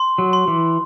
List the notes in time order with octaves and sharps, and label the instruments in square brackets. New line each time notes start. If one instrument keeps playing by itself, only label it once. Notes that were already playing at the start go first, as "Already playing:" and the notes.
Already playing: [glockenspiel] C6
[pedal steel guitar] F#3
[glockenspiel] C6
[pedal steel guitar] E3